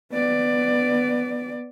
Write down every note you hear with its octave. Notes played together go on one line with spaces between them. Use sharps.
B3 D5